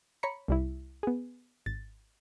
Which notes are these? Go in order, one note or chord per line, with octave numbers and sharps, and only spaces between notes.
C#5 A#5 B5 C#7
C2 G3 E4
B3 G#4
G#1 A6